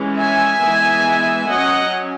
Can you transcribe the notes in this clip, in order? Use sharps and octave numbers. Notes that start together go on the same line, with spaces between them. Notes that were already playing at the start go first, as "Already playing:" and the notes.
Already playing: E3 G#3 C#4
E5 G#5
E3 G#3 B3
F#3 C#4 D#5 F#5